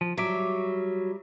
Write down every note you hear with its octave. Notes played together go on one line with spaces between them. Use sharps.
F3
F#3 G3 E5 D6